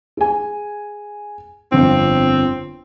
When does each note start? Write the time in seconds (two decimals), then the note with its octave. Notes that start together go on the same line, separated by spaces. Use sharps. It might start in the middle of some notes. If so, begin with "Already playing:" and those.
0.17 G#4 G#5
1.72 G1 F2 C4